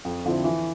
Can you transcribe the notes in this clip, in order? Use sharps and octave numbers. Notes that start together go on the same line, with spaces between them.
F2
D3 F3 C4 E4
E3